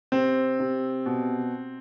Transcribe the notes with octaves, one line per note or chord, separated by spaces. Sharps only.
C3 C4
C3
B2